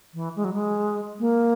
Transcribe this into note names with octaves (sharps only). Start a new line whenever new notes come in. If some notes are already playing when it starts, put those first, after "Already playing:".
E3
G#3
F#3
G#3
A#3